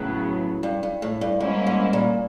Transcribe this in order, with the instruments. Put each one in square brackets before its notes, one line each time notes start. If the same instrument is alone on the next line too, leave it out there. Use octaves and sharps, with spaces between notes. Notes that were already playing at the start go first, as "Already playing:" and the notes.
Already playing: [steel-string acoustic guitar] A2 [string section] C#3 F#3 B3
[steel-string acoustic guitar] G2
G2
A2
G2
[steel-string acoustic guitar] G#2 [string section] G3 A#3 C#4 E4
[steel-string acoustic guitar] G#2
A#2